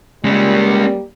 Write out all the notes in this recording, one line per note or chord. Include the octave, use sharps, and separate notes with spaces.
G3 G#3 A#3 C#4